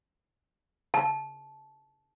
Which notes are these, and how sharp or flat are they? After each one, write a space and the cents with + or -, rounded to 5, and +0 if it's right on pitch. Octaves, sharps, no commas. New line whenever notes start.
A5 -20